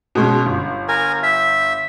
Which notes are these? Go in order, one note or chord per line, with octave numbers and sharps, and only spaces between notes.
B2 G#3 C#4
G1
A#4 G#5
E5